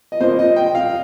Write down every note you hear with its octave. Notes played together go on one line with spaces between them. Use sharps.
D#5
A#2 A#3 C5
D#5
G5
F5